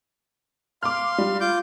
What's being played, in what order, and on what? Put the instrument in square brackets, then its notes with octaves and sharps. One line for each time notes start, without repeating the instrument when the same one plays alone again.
[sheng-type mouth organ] F5 C6 [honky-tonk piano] D6 F6
[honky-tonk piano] G3
[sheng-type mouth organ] F4 D6 G6